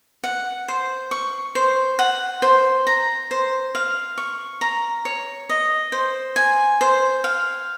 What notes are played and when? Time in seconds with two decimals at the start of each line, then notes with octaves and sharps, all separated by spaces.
0.24 F#5
0.68 C5
1.11 C#6
1.55 C5
1.99 F#5
2.42 C5
2.87 A#5
3.31 C5
3.75 F5
4.18 C#6
4.61 A#5
5.05 C#5
5.49 D#5
5.92 C5
6.36 G#5
6.81 C5
7.24 F5